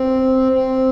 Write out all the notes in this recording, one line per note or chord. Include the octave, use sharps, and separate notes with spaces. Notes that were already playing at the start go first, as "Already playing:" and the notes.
Already playing: C4
C4